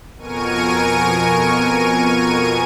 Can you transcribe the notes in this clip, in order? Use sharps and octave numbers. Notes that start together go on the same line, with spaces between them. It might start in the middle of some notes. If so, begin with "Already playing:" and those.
F2 B2 A#4 G#5 C#6 D#7